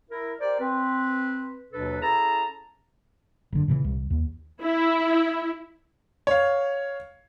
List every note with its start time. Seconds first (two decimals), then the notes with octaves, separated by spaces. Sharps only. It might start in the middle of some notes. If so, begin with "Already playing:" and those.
0.10 E4 A#4
0.40 G4 A#4 C5 D5
0.60 C4 B4
1.73 D#2 B2 F#3 D4 A4 B4
2.02 C#4 E4 G#4 A4 A5 A#5
3.53 F#1 D3
3.68 A#2 C#3 E3
3.84 C2
4.10 D#2
4.61 E4
6.27 C#5 F5